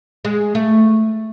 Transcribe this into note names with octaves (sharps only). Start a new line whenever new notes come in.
G#3
A3